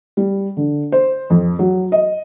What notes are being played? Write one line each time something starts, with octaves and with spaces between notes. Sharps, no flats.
G3
D3
C5
F2
F#3
D#5